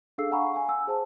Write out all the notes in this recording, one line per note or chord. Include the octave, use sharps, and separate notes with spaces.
D4 G#4 A4 F5 E6 C7
F5 F#5 G#5 A#5 B5 C#6
F5 G#5
G#5 E6
G#4 C5 A5